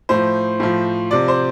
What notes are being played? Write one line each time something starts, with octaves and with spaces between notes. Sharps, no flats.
A2 F3 C5
A2 F3
C3 F3 D5
C5